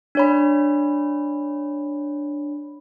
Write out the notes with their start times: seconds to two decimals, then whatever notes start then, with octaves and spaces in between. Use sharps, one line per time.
0.15 D4 C#5 B5